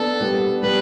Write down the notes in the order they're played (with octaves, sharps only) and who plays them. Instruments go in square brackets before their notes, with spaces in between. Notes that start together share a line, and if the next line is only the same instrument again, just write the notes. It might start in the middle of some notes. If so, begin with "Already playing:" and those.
Already playing: [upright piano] B3 D4 [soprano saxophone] A4
[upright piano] G3 B3
[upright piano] G3 B3 [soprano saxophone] B4